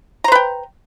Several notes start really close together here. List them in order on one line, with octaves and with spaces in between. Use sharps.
A#5 C5 B4 G5